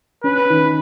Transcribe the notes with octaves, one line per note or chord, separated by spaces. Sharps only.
C#4 B4
D#3